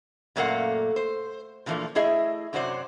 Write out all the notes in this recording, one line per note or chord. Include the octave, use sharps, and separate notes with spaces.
F#2 A#2 A3 A#3 F5 F#5
C5
A#2 D3 E3 F3 A3 A#3
A3 E4 G#4 D#5 E5
F#2 C3 F#3 F#4 C5 D5